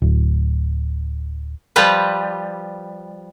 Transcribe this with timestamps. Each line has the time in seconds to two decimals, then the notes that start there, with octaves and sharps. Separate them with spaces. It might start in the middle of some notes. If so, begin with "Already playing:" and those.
0.02 D1
1.76 F3 G3 F4 B4